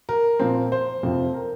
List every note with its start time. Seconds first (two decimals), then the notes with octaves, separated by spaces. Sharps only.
0.09 A#4
0.40 A#2 F3 C4
0.72 C5
1.03 F2 C3 F3 C4
1.34 A#4